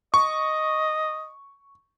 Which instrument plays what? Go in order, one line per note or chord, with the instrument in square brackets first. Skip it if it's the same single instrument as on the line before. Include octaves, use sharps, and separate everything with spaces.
[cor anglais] D#5 [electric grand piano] C#6